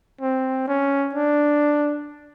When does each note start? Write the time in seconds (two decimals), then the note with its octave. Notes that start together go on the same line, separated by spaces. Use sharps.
0.21 C4
0.67 C#4
1.14 D4